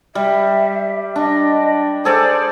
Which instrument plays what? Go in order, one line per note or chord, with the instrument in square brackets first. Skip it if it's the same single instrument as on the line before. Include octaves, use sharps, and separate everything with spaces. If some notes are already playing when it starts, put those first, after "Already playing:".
[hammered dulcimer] G3 [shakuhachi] E5
[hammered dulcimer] D4 [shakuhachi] D#5
[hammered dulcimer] G#4 A4 D5 [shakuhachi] C5